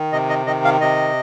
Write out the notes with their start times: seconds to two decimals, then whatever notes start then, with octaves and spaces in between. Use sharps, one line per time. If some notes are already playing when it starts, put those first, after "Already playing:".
Already playing: D#3
0.12 C3 D#5
0.29 D#5
0.46 D#3 D#5
0.65 F5
0.81 C3 D#5